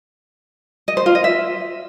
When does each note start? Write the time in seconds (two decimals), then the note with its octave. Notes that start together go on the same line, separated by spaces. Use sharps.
0.88 D#5
0.97 C5
1.06 F4
1.15 D#5
1.24 E5